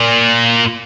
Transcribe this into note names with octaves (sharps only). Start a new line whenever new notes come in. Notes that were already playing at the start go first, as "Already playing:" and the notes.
Already playing: A#2